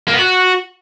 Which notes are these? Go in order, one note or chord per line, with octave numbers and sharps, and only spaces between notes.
A#3
B3
F#4